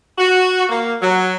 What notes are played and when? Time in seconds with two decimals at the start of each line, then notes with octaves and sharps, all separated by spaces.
0.18 F#4
0.69 A#3
1.02 F#3